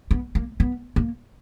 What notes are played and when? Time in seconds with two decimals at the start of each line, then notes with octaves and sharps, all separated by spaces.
0.11 B3
0.35 A#3
0.60 B3
0.96 A#3